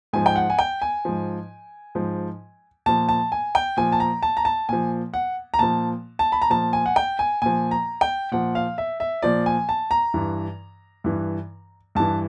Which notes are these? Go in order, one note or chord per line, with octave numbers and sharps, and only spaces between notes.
G#2 F3 G#5
G5
F#5
G#5
G5
G#5
G#2 F3
G#2 F3
A#2 F3 A5
A5
G#5
G5
A#2 F3 G#5
A5
A#5
A5
A#5
A5
A#2 F3 G#5
F#5
A#5
A#2 F3 A5
A5
B5
A#5
A#2 F3 A5
G#5
F#5
G5
G#5
A#2 F3 G#5
A#5
G5
A#2 F3 F#5
F5
E5
E5
A#2 F3 D5
G#5
A5
A#5
G2 E3
G2 E3
G2 E3 A5